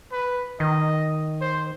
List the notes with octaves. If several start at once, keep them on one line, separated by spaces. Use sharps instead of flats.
B4
D#3 D#5
C5